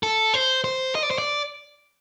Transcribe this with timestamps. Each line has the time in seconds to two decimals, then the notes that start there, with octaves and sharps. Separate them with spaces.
0.03 A4
0.34 C5
0.64 C5
0.95 D#5
1.03 D5
1.11 C5
1.18 D5